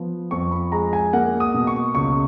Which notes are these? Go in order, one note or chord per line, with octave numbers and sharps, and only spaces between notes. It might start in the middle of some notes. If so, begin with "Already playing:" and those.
Already playing: F3 B3
F2 C#6
B5
G#3 A#5
G#5
A#3 F#5
D#6
B2
C#6
C#2 C#6